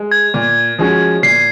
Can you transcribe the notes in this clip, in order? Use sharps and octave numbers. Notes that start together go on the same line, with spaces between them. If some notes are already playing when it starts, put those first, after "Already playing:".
Already playing: G#3
G#6
A#2
F3 G#3 C#4 F#4
A#2 C7